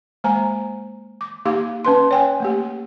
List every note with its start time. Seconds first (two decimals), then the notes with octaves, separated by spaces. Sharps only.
0.24 G#3 A#3 C5 G#5 A#5
1.21 D6
1.45 A#3 D#4 G4 F5 D6
1.85 C#4 B4 C6
2.11 C#5 G5 G#5
2.40 A3 A#3 G4